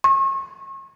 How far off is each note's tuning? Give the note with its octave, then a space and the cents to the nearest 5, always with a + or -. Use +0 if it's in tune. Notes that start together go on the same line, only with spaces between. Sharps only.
C#6 -40